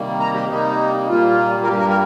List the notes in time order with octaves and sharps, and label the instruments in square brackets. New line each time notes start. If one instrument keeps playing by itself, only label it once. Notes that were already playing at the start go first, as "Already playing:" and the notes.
Already playing: [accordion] C3 D#3 G3 A#3
A#5
G4
C3 G3 A#3 D#4
A#2 G3 A#3 F4
A#4
G2 G3 A#3 G4
A#4
A#4